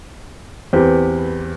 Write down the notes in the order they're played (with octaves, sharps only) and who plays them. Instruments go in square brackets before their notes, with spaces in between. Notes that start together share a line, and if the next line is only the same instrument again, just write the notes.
[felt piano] E2 [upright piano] C4 G4 B4